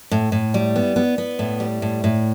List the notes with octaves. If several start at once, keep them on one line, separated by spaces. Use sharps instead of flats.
A2
A2
G3
B3
B3
B3
A2
G3
A2
A2